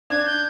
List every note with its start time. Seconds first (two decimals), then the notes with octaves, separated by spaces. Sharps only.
0.10 D4 G#6
0.26 G6